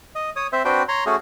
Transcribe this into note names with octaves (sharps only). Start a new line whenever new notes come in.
D#5
C#5 D#6
C4 C5 E5
C4 D4 F#4 B4 C5 G5
C#5 A#5 C6
A3 C#4 F#4 G#4